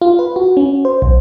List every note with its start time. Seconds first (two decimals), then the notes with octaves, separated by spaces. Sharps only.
0.02 F4
0.19 B4
0.36 F#4
0.57 C#4
0.85 C5
1.02 B1